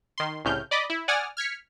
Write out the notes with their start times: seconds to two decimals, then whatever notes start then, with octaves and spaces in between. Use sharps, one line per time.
0.18 D#3 C6
0.45 C2 A2 C#3 F6 G6
0.71 D5 D#5 B5 D6
0.90 E4
1.08 D5 F#5 G#5 D#6 F6
1.37 F6 G#6 B6 C#7